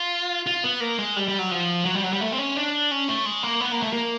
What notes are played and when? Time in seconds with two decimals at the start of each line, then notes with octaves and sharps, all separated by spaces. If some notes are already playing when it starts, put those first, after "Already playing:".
Already playing: F4
0.47 F4
0.64 B3
0.80 A#3
0.99 G#3
1.16 G3
1.28 G3
1.39 F#3
1.51 F3
1.85 F#3
1.95 G3
2.03 F#3
2.13 G3
2.21 A3
2.32 C4
2.38 C#4
2.56 D4
2.91 C#4
3.08 A3
3.25 G#3
3.43 A#3
3.61 B3
3.72 A#3
3.82 A3
3.93 A#3